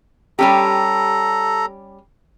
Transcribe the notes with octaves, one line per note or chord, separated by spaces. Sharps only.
G3 C#4 G4 A4 A#5